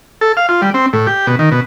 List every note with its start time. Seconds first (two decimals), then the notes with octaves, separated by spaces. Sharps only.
0.21 A4
0.37 F5
0.49 F4
0.62 G3
0.74 C4
0.93 A2
1.07 G4
1.27 B2
1.39 D#3
1.52 B2